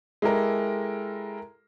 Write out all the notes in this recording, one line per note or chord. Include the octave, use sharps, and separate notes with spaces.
G#3 E4 G4 A4 A#4